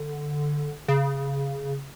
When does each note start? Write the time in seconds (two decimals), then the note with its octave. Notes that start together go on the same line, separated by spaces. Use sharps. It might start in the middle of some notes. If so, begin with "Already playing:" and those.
Already playing: D3
0.88 C#3